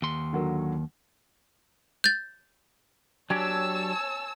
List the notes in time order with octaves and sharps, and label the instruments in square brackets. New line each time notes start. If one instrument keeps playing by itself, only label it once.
[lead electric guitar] D#2 C6
[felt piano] D3 F#3 A#4
[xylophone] G6 A6
[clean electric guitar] F#3 D4 G4 [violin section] C#5 A5 E6 [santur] G#5